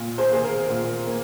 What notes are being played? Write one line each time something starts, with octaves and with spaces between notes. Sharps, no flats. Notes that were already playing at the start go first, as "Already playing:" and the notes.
Already playing: A#2
G#4 C5
A#3 G#4
A#4
A#2
A#3